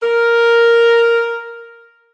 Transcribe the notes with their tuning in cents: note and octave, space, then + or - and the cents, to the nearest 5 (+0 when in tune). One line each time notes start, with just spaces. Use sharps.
A#4 +0